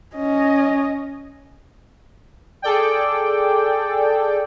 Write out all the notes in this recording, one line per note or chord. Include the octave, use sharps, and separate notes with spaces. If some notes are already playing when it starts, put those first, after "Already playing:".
C#4 D#5
G#4 A4 D5 G5